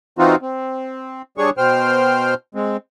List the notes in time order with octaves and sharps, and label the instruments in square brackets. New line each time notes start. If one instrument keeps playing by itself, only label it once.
[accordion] E3 C4 D#4 F4 F#4
C4
G3 D4 G#4 C#5 C#6
B2 C5 G5 F6
G#3 C4